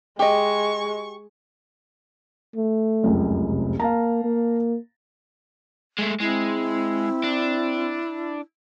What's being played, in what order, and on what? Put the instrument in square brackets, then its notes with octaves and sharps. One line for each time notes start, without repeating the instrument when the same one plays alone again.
[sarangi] G#3 [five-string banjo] G4 D#5 [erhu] C#6
[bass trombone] A3
[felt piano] F1 C#2 F#2
[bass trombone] C3
[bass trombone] A#3 [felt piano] F5 A5 A#5
[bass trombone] A#3
[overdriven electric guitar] G#3 A3
[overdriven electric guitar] G#3 [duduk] C4 [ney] E4
[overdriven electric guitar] D4